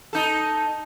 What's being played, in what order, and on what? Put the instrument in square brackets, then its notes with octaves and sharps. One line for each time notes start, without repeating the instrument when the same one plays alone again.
[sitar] D#4 A4